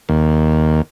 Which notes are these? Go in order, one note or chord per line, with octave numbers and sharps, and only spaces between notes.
D#2